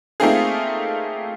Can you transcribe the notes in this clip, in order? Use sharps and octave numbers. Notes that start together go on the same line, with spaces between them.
A3 A#3 C4 D#4 F4 G#4